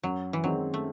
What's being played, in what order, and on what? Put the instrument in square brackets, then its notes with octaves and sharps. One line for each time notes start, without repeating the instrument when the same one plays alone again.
[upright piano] F#2 [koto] F#3
[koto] E3
[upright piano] D#3 G#3 C4 [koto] F#3
[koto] A3